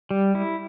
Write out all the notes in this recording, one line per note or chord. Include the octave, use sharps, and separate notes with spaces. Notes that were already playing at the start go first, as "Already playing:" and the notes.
G3
E4